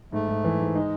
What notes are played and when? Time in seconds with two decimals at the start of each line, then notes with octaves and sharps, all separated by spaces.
0.12 G#2 A3
0.28 G#2
0.44 E3
0.59 G#2
0.75 G#3 D#4